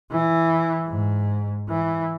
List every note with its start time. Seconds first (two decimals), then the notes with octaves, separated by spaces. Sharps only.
0.11 E3
0.87 G#2
1.69 E3